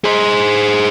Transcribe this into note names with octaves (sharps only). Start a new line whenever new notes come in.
G#4 C5